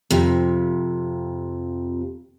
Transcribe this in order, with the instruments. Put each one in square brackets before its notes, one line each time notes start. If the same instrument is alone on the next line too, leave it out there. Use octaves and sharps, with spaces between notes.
[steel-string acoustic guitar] F2 C3